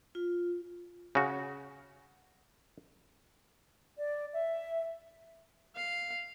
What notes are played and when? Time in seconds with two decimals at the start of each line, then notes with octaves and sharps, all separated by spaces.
0.15 F4
1.15 C#3 F#4
3.98 D5
4.32 E5
5.75 F5